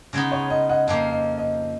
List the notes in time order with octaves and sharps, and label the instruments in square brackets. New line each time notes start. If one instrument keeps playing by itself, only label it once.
[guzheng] C#3 G#3 B3 D#4
[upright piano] C#5
D#5
D#5 F#5
[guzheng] F2 F3 A#3 [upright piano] D#5
[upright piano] D#5
D#5